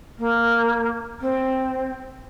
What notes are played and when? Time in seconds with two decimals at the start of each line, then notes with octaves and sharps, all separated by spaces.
0.18 A#3
1.21 C4